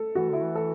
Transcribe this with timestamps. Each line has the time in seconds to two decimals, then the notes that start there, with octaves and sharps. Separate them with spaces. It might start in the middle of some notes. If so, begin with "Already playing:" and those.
Already playing: A4
0.15 E3 F#4
0.30 D3 E4
0.43 E3
0.55 A4